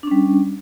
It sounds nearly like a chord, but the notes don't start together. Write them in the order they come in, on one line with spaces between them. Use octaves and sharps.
D4 C#4 G3